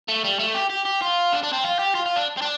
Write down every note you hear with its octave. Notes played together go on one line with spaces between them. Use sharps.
A3
G3
A3
G4
G4
G4
F4
D4
D4
C4
F4
G4
F4
F4
D4
C4
D4